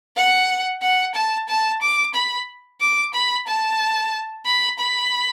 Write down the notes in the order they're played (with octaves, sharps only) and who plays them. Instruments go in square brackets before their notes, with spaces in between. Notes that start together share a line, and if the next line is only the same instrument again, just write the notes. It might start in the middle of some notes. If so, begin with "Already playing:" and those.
[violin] F#5
F#5
A5
A5
D6
B5
D6
B5
A5
B5
B5